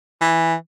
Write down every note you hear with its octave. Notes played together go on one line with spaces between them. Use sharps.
E3